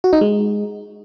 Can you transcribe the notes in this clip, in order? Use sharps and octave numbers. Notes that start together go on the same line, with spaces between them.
F#4
D#4
G#3